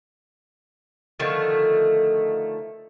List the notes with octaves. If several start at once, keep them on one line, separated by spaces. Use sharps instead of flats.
D3 D#3 F3 A3